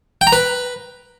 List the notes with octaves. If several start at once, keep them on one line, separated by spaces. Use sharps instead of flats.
G5
A#5
B4